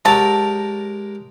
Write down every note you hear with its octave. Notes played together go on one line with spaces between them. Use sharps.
F#3 G#3 G4 A#4 A5